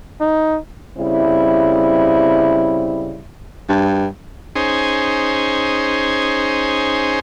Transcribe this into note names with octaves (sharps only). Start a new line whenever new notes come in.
D#4
C#3 G3 C4 E4
G2
C#4 D#4 G#4 C5